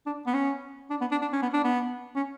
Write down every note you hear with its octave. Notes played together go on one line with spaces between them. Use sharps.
D4
B3
C#4
D4
B3
D4
D4
C#4
B3
D4
B3
C#4